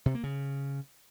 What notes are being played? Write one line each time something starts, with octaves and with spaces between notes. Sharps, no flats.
C3
A#3
C#3